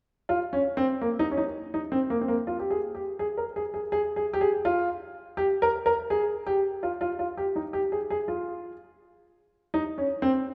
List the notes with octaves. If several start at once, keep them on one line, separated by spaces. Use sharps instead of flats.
F4
C#4
C4
A#3
D#4
C#4
D#4
D#4
C4
A#3
C4
A#3
F4
G4
G#4
G4
G#4
A#4
G#4
G#4
G#4
G#4
G4
G#4
F4
G4
A#4
A#4
G#4
G4
F4
F4
F4
G4
D#4
G4
G#4
G#4
F4
D#4
C#4
C4